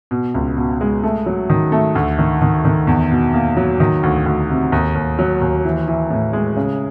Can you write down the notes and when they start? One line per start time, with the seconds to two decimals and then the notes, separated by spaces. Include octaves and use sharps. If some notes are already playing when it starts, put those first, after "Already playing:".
0.11 B2
0.34 C#2
0.57 B2
0.81 G#3
1.03 A3
1.26 F#3
1.50 D#3
1.72 A3
1.95 D2
2.19 D#3
2.42 D#3
2.65 D#3
2.87 E2
3.11 B2
3.34 A#3
3.57 F#3
3.80 D#3
4.03 D2
4.26 D2
4.49 C3
4.72 D#2
4.95 D#2
5.19 F#3
5.41 D#2
5.65 E3
5.88 E3
6.10 A2
6.33 G#3
6.57 C#3